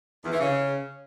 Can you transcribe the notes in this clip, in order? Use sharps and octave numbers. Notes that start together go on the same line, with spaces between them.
E2
E3
C#3